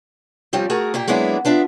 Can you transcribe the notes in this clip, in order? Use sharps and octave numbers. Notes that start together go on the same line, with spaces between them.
F3 G3 C4 C#4
A3 F#4 G#4 A#4
A#2 A#3 G4
F#3 G#3 A#3 B3 D4 E4
B3 D4 F4 E5